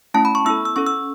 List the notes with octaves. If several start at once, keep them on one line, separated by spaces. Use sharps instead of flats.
A3 C#4 E4 A5
B5
C#6
B3 E4 A4 E6
E6
C#4 A4 C#6
E6